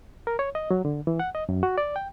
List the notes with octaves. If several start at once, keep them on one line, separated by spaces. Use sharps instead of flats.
A#4
C#5
D#5
F#3
D3
E3
F#5
D#5
F#2
F#4
D5
G5